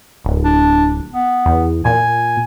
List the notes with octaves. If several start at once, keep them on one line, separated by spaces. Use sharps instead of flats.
D1
D4
B3
E2
A#2 G#5